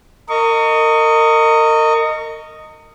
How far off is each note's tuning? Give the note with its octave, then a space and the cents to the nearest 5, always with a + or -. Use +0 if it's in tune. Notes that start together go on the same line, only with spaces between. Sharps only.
A#4 -30 D#5 +0 C#6 +20